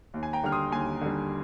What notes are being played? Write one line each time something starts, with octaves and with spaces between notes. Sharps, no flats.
D#2
G#5
G5 A#5
D3 G3 F6
C6 D#6
D#2 G#5 C6
D3 G3